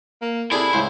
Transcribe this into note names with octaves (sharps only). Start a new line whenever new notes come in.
A#3
C3 E4 G#4 A4 D5 B5
C#2 A2 C5